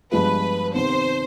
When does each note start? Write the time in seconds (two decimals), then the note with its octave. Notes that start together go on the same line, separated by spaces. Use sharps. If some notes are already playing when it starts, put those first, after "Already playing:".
0.12 G2 F3 G#3 B3 F4 B4
0.74 C3 D#3 B3 C5